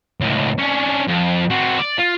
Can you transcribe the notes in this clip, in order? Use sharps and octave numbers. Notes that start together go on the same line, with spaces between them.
C#2 A2
C#4 D4
F2
C4 F#4
D5
F4